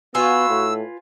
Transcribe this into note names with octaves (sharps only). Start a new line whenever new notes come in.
B3 F4 F#4 B4 G#5 E6
A2